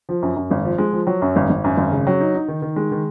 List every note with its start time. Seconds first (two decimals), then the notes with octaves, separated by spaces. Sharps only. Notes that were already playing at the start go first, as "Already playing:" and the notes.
0.09 F3
0.22 F#2
0.36 F#2
0.51 G#1
0.65 F3
0.78 G#3
0.93 F3
1.07 F#3
1.22 F#2
1.36 G#1
1.50 G#1
1.64 F#2
1.77 G#1
1.92 C#3
2.07 F#3
2.20 D#4
2.34 D#4
2.48 D#3
2.62 D#3
2.76 G#3
2.91 D#3